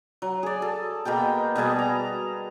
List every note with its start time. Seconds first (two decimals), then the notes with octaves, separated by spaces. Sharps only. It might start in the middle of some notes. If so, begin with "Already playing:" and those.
0.22 F#3
0.43 G#4 D5
0.62 A4
1.05 B2 A#3 G#4 G5
1.56 B2 G3 G#4 A5
1.79 A#5